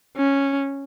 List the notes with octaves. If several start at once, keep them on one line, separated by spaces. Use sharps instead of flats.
C#4